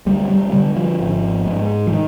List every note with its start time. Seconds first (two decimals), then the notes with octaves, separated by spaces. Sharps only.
0.06 D2 G3
0.30 G3
0.53 D3 G3
0.76 F3
1.00 G#1
1.46 G#2
1.87 F3
1.92 D#3